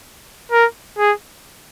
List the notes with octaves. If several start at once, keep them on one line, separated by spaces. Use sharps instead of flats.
A#4
G#4